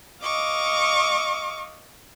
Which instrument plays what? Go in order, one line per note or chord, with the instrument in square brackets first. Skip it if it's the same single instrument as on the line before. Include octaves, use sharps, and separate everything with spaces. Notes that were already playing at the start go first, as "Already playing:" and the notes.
[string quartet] D#5 F5 C#6 D6